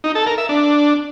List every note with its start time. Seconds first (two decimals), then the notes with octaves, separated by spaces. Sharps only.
0.04 D#4
0.15 A4
0.26 A#4
0.38 E5
0.49 D4